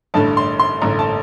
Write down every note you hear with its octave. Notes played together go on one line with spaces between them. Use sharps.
A1 G2 D3 A3 A5
C6
C6
A1 G2 D3 A3 A#5
A5